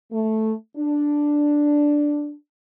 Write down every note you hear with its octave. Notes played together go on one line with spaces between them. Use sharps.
A3
D4